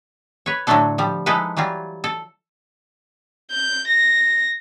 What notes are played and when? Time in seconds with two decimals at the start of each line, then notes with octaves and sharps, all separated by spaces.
0.46 B4 C#5
0.67 A2 D3 F#3 A3 D4 A4
0.98 F3 G3
1.26 F3 G#3 D#4 E4 A4 B4
1.57 E3 F#3 G3 F4
2.04 A4
3.51 G6
3.88 A#6